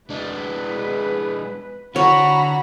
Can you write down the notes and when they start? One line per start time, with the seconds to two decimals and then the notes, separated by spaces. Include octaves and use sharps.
0.10 G#3 D4 B4
1.96 D3 F#4 C#5 A#5 B5